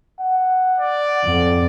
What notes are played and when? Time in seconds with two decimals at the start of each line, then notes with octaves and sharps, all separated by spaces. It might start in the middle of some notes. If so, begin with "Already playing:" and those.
0.20 F#5
0.79 D5
1.25 F2